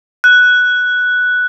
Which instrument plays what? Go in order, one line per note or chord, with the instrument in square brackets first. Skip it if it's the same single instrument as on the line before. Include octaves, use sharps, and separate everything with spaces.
[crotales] F#6